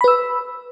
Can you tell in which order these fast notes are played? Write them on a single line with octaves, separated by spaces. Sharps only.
B5 B4 E6